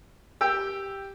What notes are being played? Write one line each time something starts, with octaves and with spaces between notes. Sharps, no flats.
G4 G5 E6